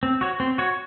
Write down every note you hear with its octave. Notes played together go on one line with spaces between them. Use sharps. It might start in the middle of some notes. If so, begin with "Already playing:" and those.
C4
F#4 C#5
C4
F#4 C#5